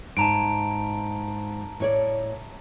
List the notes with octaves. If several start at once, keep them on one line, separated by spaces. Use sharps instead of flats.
G#2 A5 A#5 D7
A2 C#5 D5